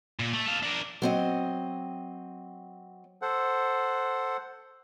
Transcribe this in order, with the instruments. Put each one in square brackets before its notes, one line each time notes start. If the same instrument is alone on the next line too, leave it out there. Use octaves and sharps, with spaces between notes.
[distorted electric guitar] A#2
A3
A4 F5
D4 A#4
[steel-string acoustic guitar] F#3 C4 D#5
[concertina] A4 C5 F#5